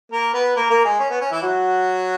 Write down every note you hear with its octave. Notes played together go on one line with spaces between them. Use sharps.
A#3 A#4
B3 B4
A#3 A#4
A#3 A#4
G#3 G#4
C#4
B3
C#4
E3 E4
F#3 F#4